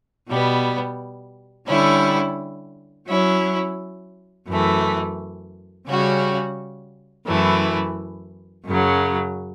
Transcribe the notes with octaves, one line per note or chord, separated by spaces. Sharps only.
B2 G3 B3
D3 G3 C#4 E4
F#3 C#4 E4
F#2 E3 A3
C#3 G3 C#4 F#4
F#2 E3 A3 E4
F#2 C#3 F#3